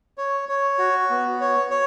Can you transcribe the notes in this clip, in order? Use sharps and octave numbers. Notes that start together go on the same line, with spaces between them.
C#5
C#5
F#4
B3
C#5
C#5